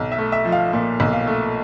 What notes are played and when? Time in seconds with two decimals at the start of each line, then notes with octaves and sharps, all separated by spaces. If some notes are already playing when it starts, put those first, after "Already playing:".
Already playing: B1
0.12 E5
0.18 A3
0.32 E5
0.45 F3
0.52 F5
0.73 A#2
1.00 B1
1.13 F5
1.27 A3